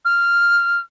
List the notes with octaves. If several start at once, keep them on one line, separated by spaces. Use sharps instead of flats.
F6